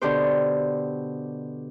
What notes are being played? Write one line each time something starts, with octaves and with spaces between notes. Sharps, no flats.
B2 D3 G4 C5